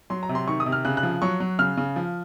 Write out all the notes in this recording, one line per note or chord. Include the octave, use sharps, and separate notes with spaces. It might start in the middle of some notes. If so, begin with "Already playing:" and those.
F#3 C6
A#5
C3
C6
D#3 C#6
D#6
C3
F6
C#3 F#6
F#6
F3
F#3 C#6
F#3
C#3 F6
C#3
F3